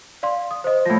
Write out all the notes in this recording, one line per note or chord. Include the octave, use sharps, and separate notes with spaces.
D5 F5 C6
D#6
C5 D#5
A2 F3 A#6